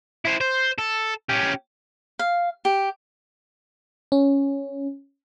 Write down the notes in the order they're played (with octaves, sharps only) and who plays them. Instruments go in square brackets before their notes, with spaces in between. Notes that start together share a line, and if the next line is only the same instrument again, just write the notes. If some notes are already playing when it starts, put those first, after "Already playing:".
[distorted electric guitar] E4 C5
C5
A4
C#4 G4
[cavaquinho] F5
G4
[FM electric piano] C#4